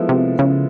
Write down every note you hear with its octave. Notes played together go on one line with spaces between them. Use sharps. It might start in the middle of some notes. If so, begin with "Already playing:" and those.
Already playing: F3 G#3 B3 E4 A4
C3
C#3